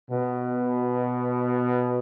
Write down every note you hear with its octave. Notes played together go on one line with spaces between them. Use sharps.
B2